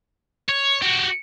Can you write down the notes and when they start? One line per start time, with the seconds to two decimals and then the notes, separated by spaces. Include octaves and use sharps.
0.49 C#5
0.82 F#4 G4